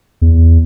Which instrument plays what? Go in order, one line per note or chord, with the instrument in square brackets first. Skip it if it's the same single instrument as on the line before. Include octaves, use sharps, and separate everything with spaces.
[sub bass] E2